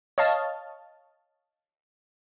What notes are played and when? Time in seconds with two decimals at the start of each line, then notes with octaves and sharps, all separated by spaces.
0.18 C#5 D#5 F5 A5